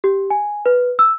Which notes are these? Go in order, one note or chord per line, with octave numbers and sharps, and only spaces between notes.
G4
G#5
B4
E6